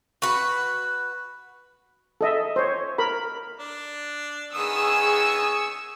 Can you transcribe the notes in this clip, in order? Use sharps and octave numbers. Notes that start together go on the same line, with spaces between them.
F#4 B4
A4 D#5 E5
C5 C#5
A#4 B5
D4
D#3 B3 G#4 C#6 D#6 E6